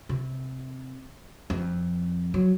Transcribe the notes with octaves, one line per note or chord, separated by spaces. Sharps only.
C3
F2
F#3